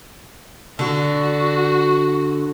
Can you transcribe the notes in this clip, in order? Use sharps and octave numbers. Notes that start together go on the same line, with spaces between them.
D3 F#4